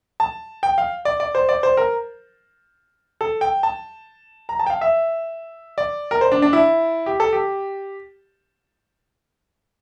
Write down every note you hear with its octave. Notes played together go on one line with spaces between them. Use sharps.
A5
G5
F5
D5
D5
C5
D5
C5
A#4
A4
G5
A5
A#5
A5
G5
F5
E5
D5
A#4
C5
D4
D4
E4
G4
A4
G4